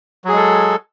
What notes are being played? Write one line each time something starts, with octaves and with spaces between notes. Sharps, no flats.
F#3 G#3 G#4 A4